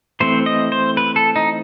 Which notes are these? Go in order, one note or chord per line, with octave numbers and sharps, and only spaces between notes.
E3 A3 C4 C5
D#5
C5
B4
A4
D#4